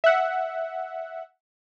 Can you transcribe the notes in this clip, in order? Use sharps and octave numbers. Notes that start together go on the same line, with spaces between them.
E5 F#5